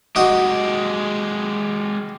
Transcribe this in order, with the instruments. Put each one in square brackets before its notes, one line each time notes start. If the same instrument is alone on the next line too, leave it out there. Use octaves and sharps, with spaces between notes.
[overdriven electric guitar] G#3 G4 [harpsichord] D#4 F#4 D#5